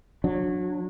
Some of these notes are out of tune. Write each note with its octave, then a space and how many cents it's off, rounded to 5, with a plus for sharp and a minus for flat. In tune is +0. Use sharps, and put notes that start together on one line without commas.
F#3 -25 D4 +5